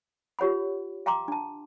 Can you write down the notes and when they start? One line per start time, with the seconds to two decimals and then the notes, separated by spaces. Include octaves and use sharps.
0.39 F4 G4 C#5 F#5 B5
1.06 F5 G5 A#5 C6 D6
1.28 D4 A5